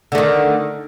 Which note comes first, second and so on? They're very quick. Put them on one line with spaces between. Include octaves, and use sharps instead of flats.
D3 A3 D#3